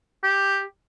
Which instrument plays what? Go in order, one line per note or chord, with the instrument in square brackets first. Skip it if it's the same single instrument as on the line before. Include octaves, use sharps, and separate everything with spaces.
[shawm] G4